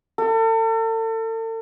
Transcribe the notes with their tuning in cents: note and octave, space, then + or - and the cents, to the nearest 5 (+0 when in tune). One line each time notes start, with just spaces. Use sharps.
A4 +40